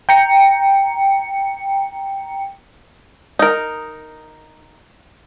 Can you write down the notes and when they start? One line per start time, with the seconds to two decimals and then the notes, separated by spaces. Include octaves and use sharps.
0.09 G5 A#5 C#7
3.39 D#4 A#4